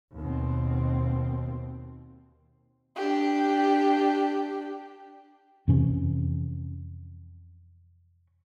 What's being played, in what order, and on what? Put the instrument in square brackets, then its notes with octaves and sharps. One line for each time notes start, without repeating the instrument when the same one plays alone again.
[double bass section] D#2 B2 C4
[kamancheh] D4 G4
[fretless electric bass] F2 C3 E3 C#4